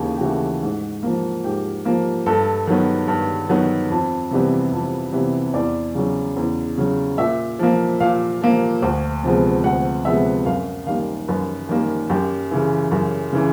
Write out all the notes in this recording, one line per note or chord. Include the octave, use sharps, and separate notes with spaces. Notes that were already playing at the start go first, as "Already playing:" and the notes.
Already playing: D#2 C#3 E3 A3 G4
G4
C#3 E3 A3 F#4
G#2
F3 A#3
G#2 G4
F3 A#3
G2 A4
D#3 F#3 B3
G2
D#3 F#3 B3
F2
C3 E3 G3 B3
F2
C3 E3 G3 B3
E2 D5
C#3 F#3
E2
C#3 F#3
A#2 E5
F3 A#3
A#2 F5
F3 A#3
D2
C3 F3 G#3 B3
D2 F#5
C3 F3 G#3 B3 E5
F#2 F5
D#3 G3 A#3 F5
F#2 B4
D#3 G3 A#3
F#2 G4
C#3 E3
F#2
C#3 E3